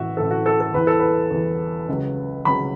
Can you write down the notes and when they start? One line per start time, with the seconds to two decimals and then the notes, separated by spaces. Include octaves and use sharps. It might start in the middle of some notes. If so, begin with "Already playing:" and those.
Already playing: A1 A2 E3 F#4 E5
0.17 A1 A2 E3 A4
0.31 F#4
0.46 A4
0.60 A4
0.74 E2 E3 B4
0.87 A4
1.00 B4
1.31 E2 E3
1.88 C#2 C#3 F#3
2.45 C#2 C#3 F#3 B5